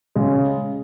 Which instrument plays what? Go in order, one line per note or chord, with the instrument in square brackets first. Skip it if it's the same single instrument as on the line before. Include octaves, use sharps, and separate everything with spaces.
[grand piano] C#3 G#3